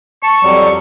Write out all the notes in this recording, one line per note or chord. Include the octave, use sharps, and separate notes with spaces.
A5 C#6
F2 F#3 G3